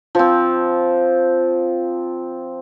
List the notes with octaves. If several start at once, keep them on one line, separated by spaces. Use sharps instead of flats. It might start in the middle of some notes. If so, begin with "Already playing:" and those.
F3 C4